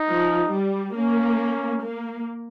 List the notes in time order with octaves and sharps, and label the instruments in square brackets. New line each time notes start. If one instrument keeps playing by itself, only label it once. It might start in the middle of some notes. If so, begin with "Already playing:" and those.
Already playing: [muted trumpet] D#4
[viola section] F3
G3
[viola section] A#3 [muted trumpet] C#4
[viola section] A#3